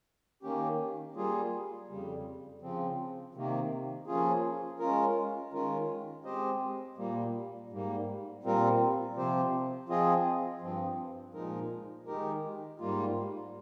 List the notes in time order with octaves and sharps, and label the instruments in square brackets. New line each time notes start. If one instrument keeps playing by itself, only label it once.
[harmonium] D#3 A#3 C#4 G4
G3 A#3 F4 G#4
F2 C#3 G3
C#3 F3 C4
C3 D#3 A#3
F3 A#3 C#4 F4 G#4
G#3 C#4 F4 A#4
D#3 G#3 C#4 F4 A#4
G#3 C4 G4 C5 D#5
A#2 G3 A#3
G#2 G3 A#3
A#2 G3 C4 F4 A#4
C3 F3 C4 G4 C5
F3 C4 F4 G#4 D#5
G2 F3 C4
A#2 F3 G#3 D#4 A#4
D#3 G#3 D#4 G4 A#4
G#2 G3 A#3 F4